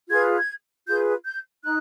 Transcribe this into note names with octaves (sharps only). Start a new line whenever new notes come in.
F4 G#4 B4 G#6
G#6
F4 G#4 B4 G6
G6
D#4 F#6